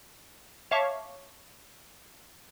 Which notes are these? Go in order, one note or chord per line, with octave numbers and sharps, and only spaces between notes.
C#5 E5 F5 A5 C#6 D6